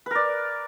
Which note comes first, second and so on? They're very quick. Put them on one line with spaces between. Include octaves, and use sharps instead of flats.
B4 A#4 D5